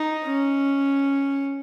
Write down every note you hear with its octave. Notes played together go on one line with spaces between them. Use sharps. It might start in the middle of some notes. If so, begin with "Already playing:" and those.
Already playing: D#4
C#4